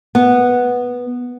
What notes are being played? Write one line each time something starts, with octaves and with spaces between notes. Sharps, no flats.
B3